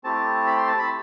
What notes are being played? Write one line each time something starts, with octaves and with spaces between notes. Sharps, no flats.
A3 C4 E4 G4 A5
B5
C6
A5
B5